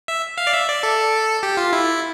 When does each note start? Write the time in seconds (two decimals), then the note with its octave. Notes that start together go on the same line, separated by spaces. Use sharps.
0.08 E5
0.38 F5
0.47 D5
0.53 E5
0.68 D5
0.83 A4
1.43 G4
1.57 F4
1.73 E4